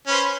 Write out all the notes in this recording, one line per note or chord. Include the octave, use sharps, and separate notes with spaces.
C#4 B4 C5